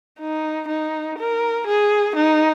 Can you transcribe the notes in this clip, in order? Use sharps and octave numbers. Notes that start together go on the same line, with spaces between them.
D#4
D#4
A#4
G#4
D#4